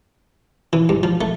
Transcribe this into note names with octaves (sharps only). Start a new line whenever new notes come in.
E3
G2
F3
A3